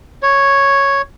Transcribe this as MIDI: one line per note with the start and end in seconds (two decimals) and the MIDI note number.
0.23 1.02 73